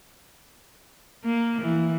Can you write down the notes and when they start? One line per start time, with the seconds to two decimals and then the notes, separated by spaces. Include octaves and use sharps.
1.24 A#3
1.61 E3